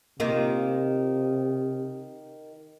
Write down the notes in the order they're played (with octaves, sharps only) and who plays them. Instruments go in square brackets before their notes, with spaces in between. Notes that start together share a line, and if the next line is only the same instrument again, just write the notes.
[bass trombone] C3 [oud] D#3 A#3 F4